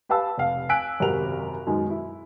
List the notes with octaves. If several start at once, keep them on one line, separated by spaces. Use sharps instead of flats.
G4 B4 F5 A5 E6
F1 F5
G#5 E6 F#6 B6 D7
G#1 F#2 C3 F#4 A#4 F7
F#2 B2 D#3 G#3
E4